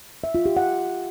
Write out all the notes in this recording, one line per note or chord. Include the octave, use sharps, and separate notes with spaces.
E5
F4
G4
F#5